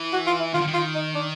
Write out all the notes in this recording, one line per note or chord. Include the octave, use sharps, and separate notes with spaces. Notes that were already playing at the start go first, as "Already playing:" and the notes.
Already playing: E3
F#4
F4
E4
D#3 F4
D3
D#3
F4
D#4
D4